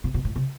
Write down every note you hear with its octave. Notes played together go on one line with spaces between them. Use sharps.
C3
B2
A2
C3